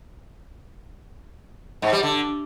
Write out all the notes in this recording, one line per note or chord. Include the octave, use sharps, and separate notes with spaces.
G#2
G3
D3